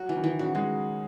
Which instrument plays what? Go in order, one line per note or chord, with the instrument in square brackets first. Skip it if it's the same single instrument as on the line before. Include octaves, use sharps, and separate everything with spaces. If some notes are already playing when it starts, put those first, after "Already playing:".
Already playing: [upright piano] F#3 [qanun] F#4
[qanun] E3
[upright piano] D#3
[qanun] E3
[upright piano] C#3 [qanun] F#4
[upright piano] G#3 [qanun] F#4